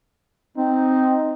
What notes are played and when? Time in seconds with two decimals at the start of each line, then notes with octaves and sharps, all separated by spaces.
0.57 C4 D#4